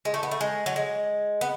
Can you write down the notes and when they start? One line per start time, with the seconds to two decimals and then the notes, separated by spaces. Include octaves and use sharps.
0.05 G#3
0.14 A3
0.23 B3
0.31 A3
0.41 G#3
0.66 F#3
0.76 G#3
1.41 B3